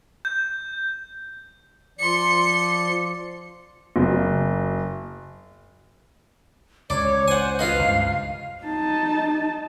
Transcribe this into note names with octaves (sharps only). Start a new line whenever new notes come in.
G6
F3 D5 C6 C#7
F#1
C#2 C#5 D5
C5 F#5 G#5
F4 B4 D#5 F5
C#2 G2
D#4 A5